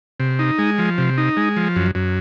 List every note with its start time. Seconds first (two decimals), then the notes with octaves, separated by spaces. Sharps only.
0.20 C3
0.39 D#4
0.58 G#3
0.78 F3
0.98 C3
1.18 D#4
1.37 G#3
1.57 F3
1.76 F#2
1.95 F#2